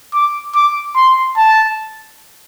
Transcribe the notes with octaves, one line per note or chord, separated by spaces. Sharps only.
D6
D6
C6
A5